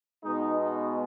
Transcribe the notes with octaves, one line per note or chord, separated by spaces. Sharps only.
B2 G#3 B3 D#4
D#4